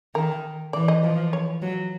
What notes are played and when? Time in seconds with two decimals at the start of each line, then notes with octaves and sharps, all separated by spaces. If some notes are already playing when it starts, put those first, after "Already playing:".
0.15 D#3 A#4
0.73 E3 D5
0.88 D#5
1.03 F3
1.33 C#5
1.62 F#3